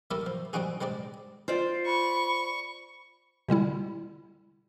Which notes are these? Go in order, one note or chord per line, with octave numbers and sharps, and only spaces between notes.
G3 A3 E4 A4 A#4 D5
F3
G3 C4 D4 D#4 F#4 G#4
G3 G#3 C4 D4 D5
F4 C5 D5
B5 C#6
B2 D3 G3 E4